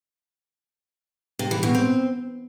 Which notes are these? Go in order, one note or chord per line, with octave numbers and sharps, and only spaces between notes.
C3
E3
B2
C4